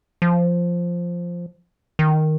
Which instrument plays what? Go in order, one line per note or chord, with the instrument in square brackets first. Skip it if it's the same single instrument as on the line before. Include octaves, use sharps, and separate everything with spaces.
[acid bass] F3
D#3